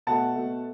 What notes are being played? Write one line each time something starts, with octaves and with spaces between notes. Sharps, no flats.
B2 A3 F#5 A5
B2 A3